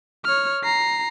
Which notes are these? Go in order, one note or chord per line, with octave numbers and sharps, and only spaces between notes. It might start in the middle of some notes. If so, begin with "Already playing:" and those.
C#5 F6
A#5 C7